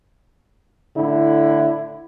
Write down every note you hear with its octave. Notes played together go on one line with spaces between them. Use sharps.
A2 D3 E4